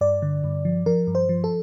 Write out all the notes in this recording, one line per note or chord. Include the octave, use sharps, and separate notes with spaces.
G2 D5
D3
G2
F3
F3 A#4
G2
C5
F3
A4